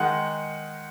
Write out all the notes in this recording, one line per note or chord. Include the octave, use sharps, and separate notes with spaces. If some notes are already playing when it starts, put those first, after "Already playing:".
Already playing: D#3 G#3 D#4 F#5